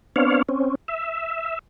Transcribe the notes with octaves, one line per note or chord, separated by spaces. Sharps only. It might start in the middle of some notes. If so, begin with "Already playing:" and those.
B3 C4 D4 C#5 F5
C4 C#4
E5